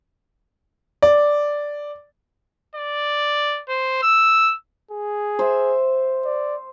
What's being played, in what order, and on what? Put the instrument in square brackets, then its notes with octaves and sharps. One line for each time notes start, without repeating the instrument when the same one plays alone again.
[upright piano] D5
[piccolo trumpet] D5
C5
E6
[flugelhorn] G#4
[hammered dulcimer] C5 E5
[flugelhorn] D5